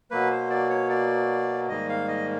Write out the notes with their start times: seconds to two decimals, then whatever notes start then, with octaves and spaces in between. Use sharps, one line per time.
0.11 B2 F#3 A#3 B4
0.31 C5
0.50 D5
0.70 C#5
0.90 D5
1.69 G#2 D#3 G3 A#3 D#5
1.89 F5
2.08 D#5